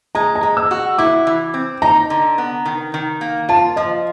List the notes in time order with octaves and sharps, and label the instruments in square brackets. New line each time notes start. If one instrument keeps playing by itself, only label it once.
[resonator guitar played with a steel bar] G#3 [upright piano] A#5
[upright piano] A#5
[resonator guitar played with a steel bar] G#3
[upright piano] E6
[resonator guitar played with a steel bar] F#4
[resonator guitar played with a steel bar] E4 [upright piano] D6
[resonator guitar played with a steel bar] E3
C4
[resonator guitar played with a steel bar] D#4 [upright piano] A#5
[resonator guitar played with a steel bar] D3
B3
D#3
D#3
A#3
[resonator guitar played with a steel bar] F4 [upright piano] A5
[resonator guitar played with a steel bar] F3 [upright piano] D#5